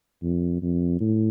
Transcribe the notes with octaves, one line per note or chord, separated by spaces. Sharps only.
F2
F2
A2